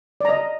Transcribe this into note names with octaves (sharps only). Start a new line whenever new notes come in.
D5 D#5 A#5